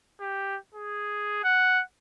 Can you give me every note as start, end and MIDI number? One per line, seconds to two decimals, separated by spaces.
0.21 0.58 67
0.75 1.42 68
1.44 1.82 78